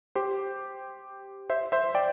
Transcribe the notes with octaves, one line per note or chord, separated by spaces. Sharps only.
G4 C5
C5 E5
C5 E5
D5 G5